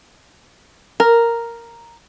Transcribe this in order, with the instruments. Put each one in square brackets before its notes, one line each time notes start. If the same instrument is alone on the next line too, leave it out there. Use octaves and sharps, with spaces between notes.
[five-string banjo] A#4